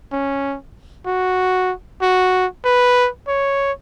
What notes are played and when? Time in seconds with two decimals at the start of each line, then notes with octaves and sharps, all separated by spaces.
0.12 C#4
1.06 F#4
2.02 F#4
2.65 B4
3.28 C#5